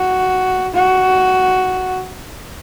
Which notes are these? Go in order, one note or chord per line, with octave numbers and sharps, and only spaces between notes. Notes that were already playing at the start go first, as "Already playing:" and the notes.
Already playing: F#4
F#4